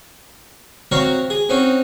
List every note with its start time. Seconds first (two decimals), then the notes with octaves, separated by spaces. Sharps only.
0.91 F#3 C4 F#4 F5 A#5 C#6
1.30 G#4
1.49 C4 C#4 D#4 F#4